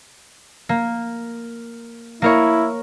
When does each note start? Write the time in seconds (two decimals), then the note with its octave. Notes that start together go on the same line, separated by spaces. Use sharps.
0.69 A#3
2.22 A#3 E4 A#4 C#5